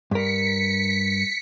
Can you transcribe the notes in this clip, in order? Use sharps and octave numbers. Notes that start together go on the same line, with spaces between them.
G2 A#4 B6 C#7